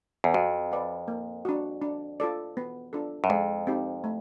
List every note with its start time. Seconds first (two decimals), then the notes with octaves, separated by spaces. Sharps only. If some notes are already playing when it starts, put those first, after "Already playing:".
0.24 E2
0.34 F2 F#4
0.71 B4 D5 F#5
1.08 A#3
1.45 D4 F#4
1.82 D4
2.20 F4 A4 D5
2.57 B3
2.93 D4 F4 A4
3.24 F#2
3.30 F2 G#3
3.67 C4 D#4 G4
4.04 A3